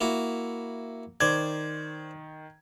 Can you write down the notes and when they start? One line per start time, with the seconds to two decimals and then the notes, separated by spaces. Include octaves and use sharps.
0.01 A#3 E4 F#4
1.20 D#3 C5 D5 G#6